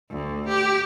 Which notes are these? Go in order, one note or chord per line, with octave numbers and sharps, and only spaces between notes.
D2
G4